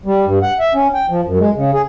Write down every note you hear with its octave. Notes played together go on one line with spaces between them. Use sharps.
G3
G2
F#5
E5
C#4
G5
F3
F#2
G#3
C#3
G#4